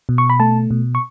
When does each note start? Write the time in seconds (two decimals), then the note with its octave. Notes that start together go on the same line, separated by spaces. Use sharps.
0.09 B2
0.18 C#6
0.30 B5
0.40 A3 A5
0.71 B2
0.95 C#6